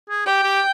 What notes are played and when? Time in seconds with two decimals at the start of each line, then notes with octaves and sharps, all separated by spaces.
0.09 G#4
0.26 G4 G5
0.43 G4